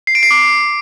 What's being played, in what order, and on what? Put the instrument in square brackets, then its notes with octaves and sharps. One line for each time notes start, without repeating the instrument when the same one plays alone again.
[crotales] C7
D7
C7
D6